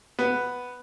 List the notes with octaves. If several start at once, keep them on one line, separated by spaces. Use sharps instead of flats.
B3